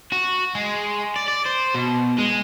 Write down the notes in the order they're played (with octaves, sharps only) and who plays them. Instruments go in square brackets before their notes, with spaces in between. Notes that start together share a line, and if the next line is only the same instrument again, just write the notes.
[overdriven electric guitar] F#4
G#3
D5
D5
C5
B2
G#3